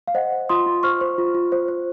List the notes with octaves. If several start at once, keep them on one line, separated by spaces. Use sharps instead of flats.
F5
C5 D#5 F#5
C5
F4 C6 D#6
F4
C5 C#6 F6
C5
F4
F4
C5
C5